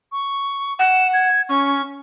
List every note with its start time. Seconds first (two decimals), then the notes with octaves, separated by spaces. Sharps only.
0.12 C#6
0.79 F#5 E7
1.13 G#6
1.49 C#4 C#6